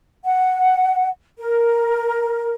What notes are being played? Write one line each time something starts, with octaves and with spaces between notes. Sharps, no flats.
F#5
A#4